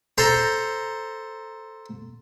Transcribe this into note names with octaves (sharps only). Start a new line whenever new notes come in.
A4 C5 A#5